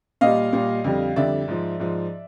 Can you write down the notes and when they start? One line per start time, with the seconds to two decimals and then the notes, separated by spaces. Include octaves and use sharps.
0.21 A#2 G3 D#5 F5
0.53 A#2 G3
0.84 F2 D3 G3
1.16 F2 D3 G3 D5 E5
1.48 G#2 F3
1.80 G#2 F3